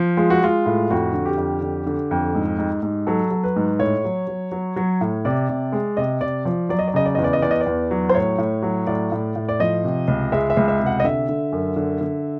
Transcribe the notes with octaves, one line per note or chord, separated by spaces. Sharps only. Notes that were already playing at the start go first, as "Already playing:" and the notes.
Already playing: F3
G#3 F4
F#4
G#3 F4
A2
F2 F#4
D3
G4
F2
D3
D3
F2
G#2
G#2
G#2
F#3 A4
F#3
B4
G#2
A2 C#5
F#3
F#3
F#3
F#3
A2
C3 D5
C3
G#3
C3 D#5
C3 D5
F3 D5
F#3 D5
D#5
D5
C#3 D#5
D5
E2 D#5
D5
D#5
E2 D5
D#5
D5
E2
F#3
C5
A2 C#5
A2
F#3
A2 D5
A2
A2
D5
F3 D#5
C3
C#2
G#3 E5
E5
C#2
E5
C3
F#5
D#5
D3 E5
D3
F#2
D3
D3